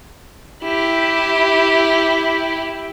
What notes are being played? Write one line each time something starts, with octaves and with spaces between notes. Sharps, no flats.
E4 G4